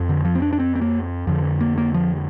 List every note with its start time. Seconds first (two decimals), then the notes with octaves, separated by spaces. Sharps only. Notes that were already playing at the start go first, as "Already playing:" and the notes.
Already playing: F2
0.09 D3
0.25 F3
0.35 C4
0.42 D4
0.53 D4
0.60 C4
0.75 C4
0.81 A#3
1.27 F2 D3 F3
1.61 A#3
1.78 A#3
1.94 F3